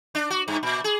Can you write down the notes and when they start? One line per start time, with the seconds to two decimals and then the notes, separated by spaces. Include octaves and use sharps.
0.15 D4
0.30 F#4
0.48 G2
0.63 A#2
0.84 G#4